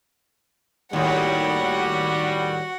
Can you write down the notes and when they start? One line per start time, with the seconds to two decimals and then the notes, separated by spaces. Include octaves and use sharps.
0.93 D#2 A2 G3 F#4 F#5